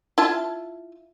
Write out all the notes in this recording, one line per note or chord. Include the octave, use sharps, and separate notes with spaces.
E4 F4 A5